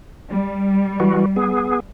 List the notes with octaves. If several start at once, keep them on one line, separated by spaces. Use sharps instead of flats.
G3
E3 F#4
B3 G#4